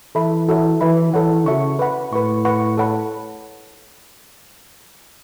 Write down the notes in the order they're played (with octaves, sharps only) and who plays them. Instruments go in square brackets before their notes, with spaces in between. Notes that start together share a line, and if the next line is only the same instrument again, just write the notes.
[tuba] E3 [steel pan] A4 E5 B5
[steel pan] F#4 A4 C#5 E5
[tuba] E3 [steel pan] B4 E5 B5
[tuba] E3 [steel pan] A4 C#5 F#5
[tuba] C#3 [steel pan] F#4 A4 C#5 E5 C#6
[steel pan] B4 F#5 B5
[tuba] A2 [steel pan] B4 F#5 C#6
[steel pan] B4 F#5 C#6
A4 C#5 F#5 B5